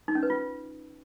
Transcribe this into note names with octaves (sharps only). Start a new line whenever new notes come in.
D#4
C#4
B4
F4